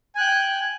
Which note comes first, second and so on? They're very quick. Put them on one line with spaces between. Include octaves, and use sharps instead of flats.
G#5 F#6 G5